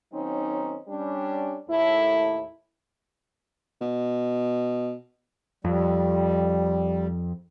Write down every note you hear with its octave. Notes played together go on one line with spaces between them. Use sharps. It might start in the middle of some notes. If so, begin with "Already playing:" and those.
D#3 F#3 C4 C#4 D#4
G3 C#4 D4
D#2 A2 E4
B2
F2 G3